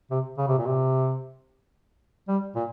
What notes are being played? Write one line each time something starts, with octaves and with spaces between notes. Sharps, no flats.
C3
C#3
C3
A#2
C3
G3
A#2